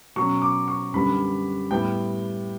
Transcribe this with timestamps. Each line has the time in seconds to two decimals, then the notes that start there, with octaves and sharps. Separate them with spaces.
0.16 B2 F#3 C#4 C#6
0.42 D6
0.68 C#6
0.94 F#2 D3 G3 B3 D4 B5
1.71 A2 G3 B3 G5